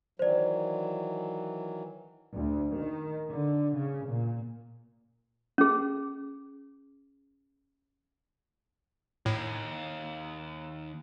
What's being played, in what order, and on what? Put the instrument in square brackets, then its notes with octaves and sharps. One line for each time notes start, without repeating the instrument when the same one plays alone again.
[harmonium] D#3 E3 F#3 [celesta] C5 D5
[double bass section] D2
D#3
D3
C#3
A#2
[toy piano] C#4 G#4
[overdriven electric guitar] D#2 [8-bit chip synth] A2